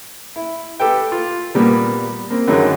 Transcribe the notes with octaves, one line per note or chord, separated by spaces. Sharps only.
E4
G4 A4 B4 G5
F4
A#2 G3 A#3 B3
A#3 C4
F#2 D3 D#3 F#3 G#3 C#4